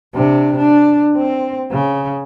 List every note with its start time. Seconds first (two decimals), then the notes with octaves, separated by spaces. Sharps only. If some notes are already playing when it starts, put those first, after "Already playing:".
0.14 C3 D4
0.57 D4
1.16 C4
1.72 C#3